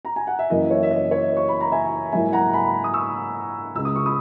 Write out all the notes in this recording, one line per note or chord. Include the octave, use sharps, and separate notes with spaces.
A#5
G#5
F#5
E5
F#2 E3 A#3 D#5
C#5 E5
E5
D#5
C#5
C#6
B5
A#5
E5 G#5
G#2 F#3 A#3 E4 E5 G#5
F#5 A#5
G#5 B5
D#6
C#6 E6
C#2 C#3 G#3 E6
D#6
C#6
B5 D#6